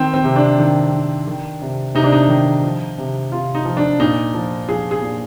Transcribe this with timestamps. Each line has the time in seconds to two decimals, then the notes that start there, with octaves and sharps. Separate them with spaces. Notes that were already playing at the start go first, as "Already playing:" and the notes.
Already playing: D#3 C4
0.14 C4
0.24 C3
0.36 D4
0.59 D#3
0.92 D#3
1.27 D#3
1.62 C3
1.95 C3 D#4
2.04 D4
2.13 D#4
2.29 D#3
2.63 F3
2.98 C3
3.32 C3 F4
3.55 D#4
3.65 F3
3.77 D4
4.00 A#2 D#4
4.34 F3
4.69 F3 G#4
4.91 G#4
5.02 A#2